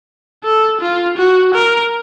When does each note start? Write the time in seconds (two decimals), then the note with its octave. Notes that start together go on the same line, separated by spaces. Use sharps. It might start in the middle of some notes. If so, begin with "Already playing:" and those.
0.44 A4
0.81 F4
1.18 F#4
1.54 A#4